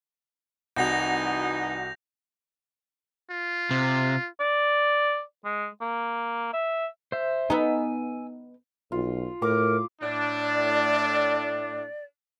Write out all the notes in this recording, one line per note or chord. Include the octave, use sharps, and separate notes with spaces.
C2 E3 D#4 F#4 G6 A#6 F7
F4
C3
D5
G#3
A#3
E5
C5 E5
B3 D#4 G#5 E6
B1 F4
A2 A#4 D6
A2 D4 D5